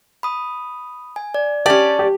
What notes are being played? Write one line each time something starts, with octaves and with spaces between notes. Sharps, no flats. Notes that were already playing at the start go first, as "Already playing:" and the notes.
B5 D#6
G#5
D5
C#4 G4 D5 A5
G4